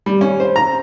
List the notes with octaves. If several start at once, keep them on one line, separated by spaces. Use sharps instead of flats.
G3
C#4
C5
A#5